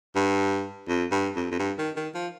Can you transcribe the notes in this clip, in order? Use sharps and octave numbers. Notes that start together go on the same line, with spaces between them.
G2
F2
G2
F2
F2
G2
D#3
D#3
F3